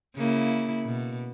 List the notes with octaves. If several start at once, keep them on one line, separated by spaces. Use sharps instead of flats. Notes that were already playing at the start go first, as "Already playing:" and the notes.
C#3 A#3 E4
B2